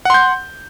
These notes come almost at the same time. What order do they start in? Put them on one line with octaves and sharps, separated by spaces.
F#5 C6 G6